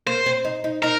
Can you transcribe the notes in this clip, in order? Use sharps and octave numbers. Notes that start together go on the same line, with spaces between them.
A#3 C5
C4
D#4
D#4
D#4 A#4